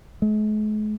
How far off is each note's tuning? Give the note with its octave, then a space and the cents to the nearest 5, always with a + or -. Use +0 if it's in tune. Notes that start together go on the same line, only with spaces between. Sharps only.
G#3 +45